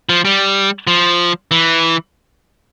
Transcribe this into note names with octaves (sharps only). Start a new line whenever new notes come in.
F3
G3
F3
E3